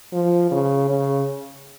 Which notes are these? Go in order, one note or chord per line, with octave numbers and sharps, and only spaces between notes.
F3
C#3
C#3